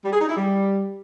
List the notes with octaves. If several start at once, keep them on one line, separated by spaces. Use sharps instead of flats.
G3
G#4
D#4
E4
G3